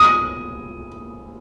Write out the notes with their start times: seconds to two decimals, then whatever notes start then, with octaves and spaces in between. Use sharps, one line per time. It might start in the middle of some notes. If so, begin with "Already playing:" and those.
Already playing: D#6